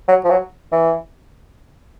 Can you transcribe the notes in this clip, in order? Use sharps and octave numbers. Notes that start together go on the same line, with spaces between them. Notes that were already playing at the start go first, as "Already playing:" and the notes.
F#3
F3
F#3
E3